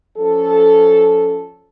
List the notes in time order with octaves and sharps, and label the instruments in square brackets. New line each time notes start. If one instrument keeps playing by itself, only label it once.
[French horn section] F3 C#4 A4